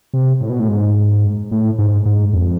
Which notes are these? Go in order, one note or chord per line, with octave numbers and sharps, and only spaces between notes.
C3
A2
B2
A2
G#2
A2
G#2
G#2
F2